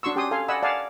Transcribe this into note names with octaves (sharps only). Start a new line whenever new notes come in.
D4 F#4 C6 C#6 E6
C#4 G4 G5 G#5 C6 D#6
A4 F5 G#5 C6
D5 D#5 F#5 G#5 B5 E6
D5 D#5 F5 F#5 G#5 A5